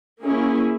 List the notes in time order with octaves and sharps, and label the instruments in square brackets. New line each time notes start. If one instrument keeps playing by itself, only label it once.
[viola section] A#3 C#4 E4 G#4